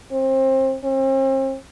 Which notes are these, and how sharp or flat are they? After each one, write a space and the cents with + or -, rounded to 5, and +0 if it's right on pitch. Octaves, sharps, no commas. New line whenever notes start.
C4 +25
C4 +40